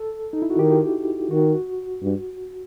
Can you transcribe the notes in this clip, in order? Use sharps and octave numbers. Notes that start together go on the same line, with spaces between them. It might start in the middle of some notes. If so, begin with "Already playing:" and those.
Already playing: A4
D#4
E4
F#4
D#3 G4
D#3 F#4
G2